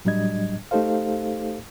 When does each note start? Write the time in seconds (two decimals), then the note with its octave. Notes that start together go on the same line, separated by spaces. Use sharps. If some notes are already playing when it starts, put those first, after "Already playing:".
0.05 A2 F#3 G3 D4 D#5 G#6
0.71 A3 D#4 G4 A4 C5 F5